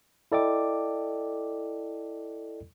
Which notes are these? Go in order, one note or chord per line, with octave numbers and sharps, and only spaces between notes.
E4 A4 D5 D#5 G5 D6